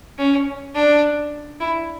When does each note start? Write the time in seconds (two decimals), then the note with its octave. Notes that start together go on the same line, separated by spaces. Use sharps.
0.18 C#4
0.75 D4
1.60 E4